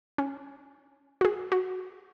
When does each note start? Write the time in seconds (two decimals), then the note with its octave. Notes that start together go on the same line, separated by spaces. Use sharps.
0.18 C#4
1.21 F#4
1.25 G#4
1.52 F#4